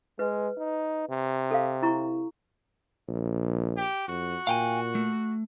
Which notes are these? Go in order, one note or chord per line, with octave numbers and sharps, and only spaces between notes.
G#3 B4
D#4
C3
A4 F5
E4 A#5 C#6
A#1
G4
F2 F#4
A#2 F5 G5 G#5
A3